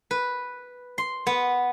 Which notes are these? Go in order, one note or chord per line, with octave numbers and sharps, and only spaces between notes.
B4
C6
B3